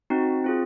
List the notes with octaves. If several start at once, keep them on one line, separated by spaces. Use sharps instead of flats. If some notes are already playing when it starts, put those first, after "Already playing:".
C4 D#4 F#4
C4 F4 G#4